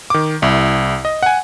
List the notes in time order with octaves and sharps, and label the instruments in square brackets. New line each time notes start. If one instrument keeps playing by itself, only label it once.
[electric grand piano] D#3 D6
C2 E4
D#5
F#5 G#5